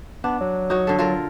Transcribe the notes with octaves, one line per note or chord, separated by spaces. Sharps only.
B3 D4
F#3
D#4 F#4 C#5
D3 A4
F4 A4 A#4